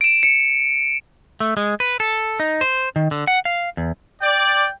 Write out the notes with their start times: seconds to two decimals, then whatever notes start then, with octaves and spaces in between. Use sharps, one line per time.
0.01 D7 E7
0.23 C#7
1.40 A3
1.57 G#3
1.80 B4
2.00 A4
2.40 D#4
2.61 C5
2.96 D#3
3.11 D3
3.27 F#5
3.45 F5
3.77 E2
4.21 D5 G5